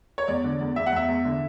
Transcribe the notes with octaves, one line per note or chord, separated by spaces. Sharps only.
C#5
E2 D5
D3
E2
E2 E5
F#5
E2 E5
E2
D3